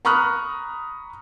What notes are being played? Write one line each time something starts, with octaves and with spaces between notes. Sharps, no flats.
A#5 B5 C#6 D#6 F6 F#6